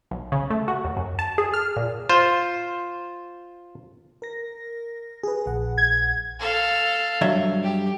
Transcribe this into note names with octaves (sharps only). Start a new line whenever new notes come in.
B1
C#3
A3
F#4
D#2
F#2
A5
G#4
F6
A#2
F4 C5
A#4 A#6
G#4 B4
A#1 F#5
G#6
A4 F5
G2 F#3 E5
G4